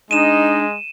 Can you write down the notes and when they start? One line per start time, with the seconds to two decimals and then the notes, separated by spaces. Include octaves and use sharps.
0.11 G#3 D4 D#4 D#7 E7